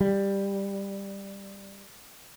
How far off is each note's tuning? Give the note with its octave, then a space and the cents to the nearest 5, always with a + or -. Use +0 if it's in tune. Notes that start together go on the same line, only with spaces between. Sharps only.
G3 +10